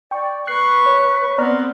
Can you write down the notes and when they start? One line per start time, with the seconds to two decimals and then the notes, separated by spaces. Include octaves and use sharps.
0.11 D5 G5 C#6
0.47 B4 C#6 F#6 C7
0.86 C#5
1.38 B3 C4 D5 A#5 F6